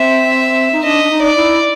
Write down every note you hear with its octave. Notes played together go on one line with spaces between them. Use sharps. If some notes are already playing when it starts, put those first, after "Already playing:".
Already playing: C4 E5
D#4
D4 D#5
D4
D#4
D5
E4